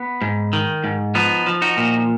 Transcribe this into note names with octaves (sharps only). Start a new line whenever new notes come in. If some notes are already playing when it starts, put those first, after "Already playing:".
Already playing: B3
G#2
D#3
G#2
F3 B3 D#4
F3
D#4 F#4
A#2